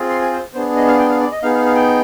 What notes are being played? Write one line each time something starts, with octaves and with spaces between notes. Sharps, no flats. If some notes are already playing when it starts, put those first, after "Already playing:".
Already playing: C4 F4 G#4
C6
G#5
C5
B3 D4 G#4 C5
D#5
F5
G5
F5
D5
D#5
B3 D#4 G#4 F5
F5
F5
G5